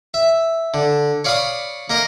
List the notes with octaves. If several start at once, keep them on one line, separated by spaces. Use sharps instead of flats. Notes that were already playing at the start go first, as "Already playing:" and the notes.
E5
D3
C#5 D5 F5 B5 C#6 D#6
A#3 A#4 D#5